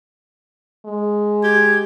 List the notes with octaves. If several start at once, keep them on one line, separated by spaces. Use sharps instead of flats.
G#3
G4 G#6